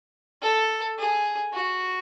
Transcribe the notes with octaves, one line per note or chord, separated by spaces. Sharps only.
A4
G#4
F#4